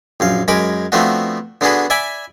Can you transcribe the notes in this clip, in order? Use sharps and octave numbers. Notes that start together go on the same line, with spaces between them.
A#1 F#2 F5
F#2 G#3 A#4 B5 D6
F3 A3 B3 C4 D4 F#4
D3 B3 D4 F#4 G#4 B4
D5 E5 G#5 B5 D6